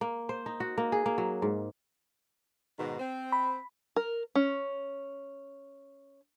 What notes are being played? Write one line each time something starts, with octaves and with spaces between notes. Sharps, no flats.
A#3
C5
D#4
F#4
A#3
G#4
A#3
F#3
G#2
G#2 B2 D#3
C4
B5
A#4
C#4